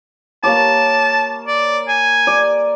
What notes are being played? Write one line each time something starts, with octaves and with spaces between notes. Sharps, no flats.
A#3 C#5 A5 D6
D5
G#5
D5